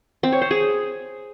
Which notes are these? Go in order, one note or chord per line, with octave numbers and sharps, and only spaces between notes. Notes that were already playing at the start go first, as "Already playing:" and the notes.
C4
C#5
C5
G#4